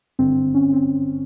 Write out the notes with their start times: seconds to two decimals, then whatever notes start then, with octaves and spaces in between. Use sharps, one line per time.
0.19 G#1 G2 D3 C4
0.54 C#4
0.73 C4